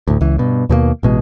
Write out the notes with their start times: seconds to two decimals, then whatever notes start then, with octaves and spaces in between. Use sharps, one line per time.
0.08 D2 A2
0.21 C#2 E3
0.38 G2 B2
0.69 D#2 B2 F#3 A#3
1.03 A1 B2 G#3